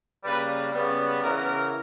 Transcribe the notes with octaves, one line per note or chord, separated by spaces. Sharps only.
C#3 G3 A#3 B4
C#3 G3 B3
C#3 E3 B3 A#4